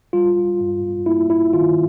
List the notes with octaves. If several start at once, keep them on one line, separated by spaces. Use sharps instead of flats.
G3 F4
G2
A#3 E4
E4
D#3 F4